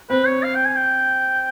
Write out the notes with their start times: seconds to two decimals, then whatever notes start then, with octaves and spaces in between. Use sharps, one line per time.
0.10 C4 B4
0.26 C#5
0.43 F5
0.55 G5
0.65 G#5
0.76 G5